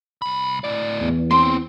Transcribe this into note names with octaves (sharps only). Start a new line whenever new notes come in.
C2 B5
A2 D5
E2
A#3 C4 C6